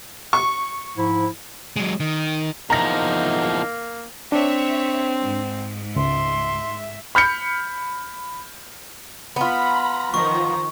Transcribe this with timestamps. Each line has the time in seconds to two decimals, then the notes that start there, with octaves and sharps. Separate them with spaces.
0.33 C#6
0.97 G#2 F3 E4
1.76 F#3 G#3
2.00 D#3
2.70 E2 F3 A#3 D#4 A#5 A#6
4.32 C4 D4 C#5 E5
5.23 G#2
5.96 C#2 E5 C6
7.15 B5 F6 G6 C#7
9.36 B3 F4 A#5 B5
10.14 D#3 F3 A#5 C#6